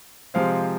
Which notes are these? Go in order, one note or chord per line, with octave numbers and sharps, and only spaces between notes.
C3 F3 G#3 C4 F5